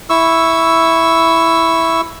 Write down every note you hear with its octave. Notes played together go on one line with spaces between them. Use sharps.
E4 C#6 E6